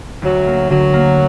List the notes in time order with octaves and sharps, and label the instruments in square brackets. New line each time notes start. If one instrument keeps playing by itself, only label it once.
[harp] D2 [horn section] F#3
[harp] A#3
[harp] D3 [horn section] F#3
[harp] A#3